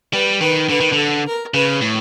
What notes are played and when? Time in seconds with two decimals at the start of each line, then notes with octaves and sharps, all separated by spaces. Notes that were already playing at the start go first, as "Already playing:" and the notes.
0.13 G3 B4
0.41 D#3 B4
0.69 D3 B4
0.80 D#3
0.92 D3
0.97 A4
1.26 A#4
1.54 C#3 B4
1.81 A2